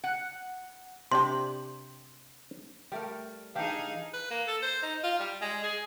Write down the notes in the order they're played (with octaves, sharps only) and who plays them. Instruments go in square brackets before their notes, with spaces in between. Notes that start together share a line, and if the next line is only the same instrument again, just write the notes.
[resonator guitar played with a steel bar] F#5
[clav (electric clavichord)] C3 D4 G4 [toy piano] C6
[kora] G3 A3 A#4
[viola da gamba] E3 D#4 G#4 [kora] D4 G4 [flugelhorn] F5
[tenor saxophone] B4
A#3
A4
C5
D#4
F4
G3
G#3
G#4